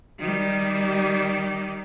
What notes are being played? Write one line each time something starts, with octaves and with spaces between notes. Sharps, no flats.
D#3 G3